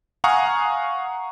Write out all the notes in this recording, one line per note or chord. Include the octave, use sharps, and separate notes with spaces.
F5 F#5 G#5 A#5 C#6 D#6